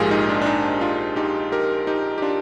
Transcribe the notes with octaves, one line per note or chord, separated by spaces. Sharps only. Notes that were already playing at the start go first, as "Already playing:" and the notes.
Already playing: A#1 G#2 F3 G#3 F4 G4 G#4 A#4
D#4
D4
D4
D#4
D4 F4
D#4 G4
G4 A#4
D#4 G4
G4
D4 F4